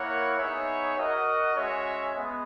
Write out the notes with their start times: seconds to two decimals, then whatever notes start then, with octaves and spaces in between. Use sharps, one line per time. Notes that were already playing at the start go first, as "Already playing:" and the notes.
Already playing: A#3 E4 A#4 C#5 F#5
0.38 B3 D#4 G#4 C#5 E5
0.96 F#4 A#4 D#5 F#5
1.56 G#3 C#4 F#4 C#5 E5
2.14 G#3 B3